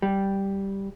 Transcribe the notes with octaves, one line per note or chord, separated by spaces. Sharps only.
G3